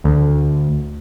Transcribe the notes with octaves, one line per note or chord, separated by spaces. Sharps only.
D2